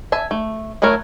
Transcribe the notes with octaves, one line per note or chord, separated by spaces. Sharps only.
E5 G#5 A5
A3
F#3 A3 E4 A#4 C#5